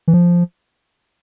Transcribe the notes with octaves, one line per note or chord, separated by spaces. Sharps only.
E3
F3